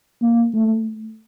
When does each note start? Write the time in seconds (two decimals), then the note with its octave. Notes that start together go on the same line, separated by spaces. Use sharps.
0.22 A#3
0.54 A3